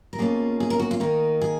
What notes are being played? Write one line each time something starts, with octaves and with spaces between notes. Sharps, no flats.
A#4
B2 A#3 C#4 F4 G#4
G#4
A#4
F#4
F4
D#3 A#3 D#4 F#4
G#4